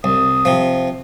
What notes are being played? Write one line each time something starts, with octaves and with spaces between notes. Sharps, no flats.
C2 D#6
C3 F3